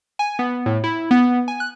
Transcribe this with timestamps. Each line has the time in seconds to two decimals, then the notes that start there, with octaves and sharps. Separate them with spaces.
0.19 G#5
0.39 B3
0.66 A2
0.84 E4
1.11 B3
1.48 G#5
1.60 F#6